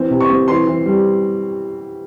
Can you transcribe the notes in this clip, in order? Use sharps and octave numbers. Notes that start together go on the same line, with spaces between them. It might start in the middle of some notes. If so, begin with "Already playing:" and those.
Already playing: E3 C4
C3
C#6
C4
E3 C6
E3
G3